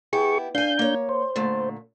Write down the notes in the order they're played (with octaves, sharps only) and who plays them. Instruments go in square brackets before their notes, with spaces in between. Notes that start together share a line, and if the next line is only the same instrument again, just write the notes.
[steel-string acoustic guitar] B3 E4 G4 [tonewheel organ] G#4 C#6
[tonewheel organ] D4 G6 [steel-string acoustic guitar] F5 G#5
[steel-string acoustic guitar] A#3 C#5
[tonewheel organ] C5
[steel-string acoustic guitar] A#2 D3 A3